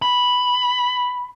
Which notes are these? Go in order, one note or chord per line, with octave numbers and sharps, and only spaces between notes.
B5